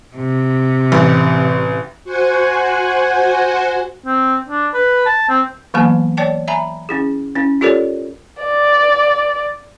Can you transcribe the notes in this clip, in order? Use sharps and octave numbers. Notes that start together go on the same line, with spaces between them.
C3
A1
F#4 C5 F#5 G#5
C4
D4
B4
A5
C4
E3 F#3 A#3 B3 G#5 A5
C#5 D5 G5 A5
E5 G#5 A#5 B5
C#4 E4 G#4
C#4 E4
F4 G4 A4 A#4 C#5 D5
D5